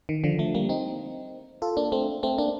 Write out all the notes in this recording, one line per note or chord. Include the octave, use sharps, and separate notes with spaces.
D#3
D3 F3
F3 A3
G3 A#3
C4 D#4
F4 A4
A#3 D4
A3 C4
A3 C4
A#3 D4